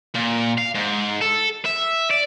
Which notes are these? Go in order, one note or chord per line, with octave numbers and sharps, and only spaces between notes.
A#2
F5
G#2
A4
E5
D5